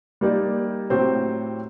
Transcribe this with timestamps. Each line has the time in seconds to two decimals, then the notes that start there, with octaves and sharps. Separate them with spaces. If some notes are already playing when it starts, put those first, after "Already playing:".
0.21 G3 A#3 D#4 G4 D5
0.90 A2 F#3 C4 G4 C5